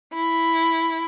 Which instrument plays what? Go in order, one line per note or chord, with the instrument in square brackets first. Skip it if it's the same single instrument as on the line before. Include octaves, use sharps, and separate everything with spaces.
[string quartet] E4